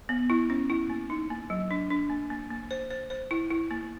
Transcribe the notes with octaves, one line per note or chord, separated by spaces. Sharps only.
B3
E4
C#4
E4
A#3
D#4
A#3
F#3
D4
D4
A#3
A#3
A#3
C5
C5
C5
E4
E4
A#3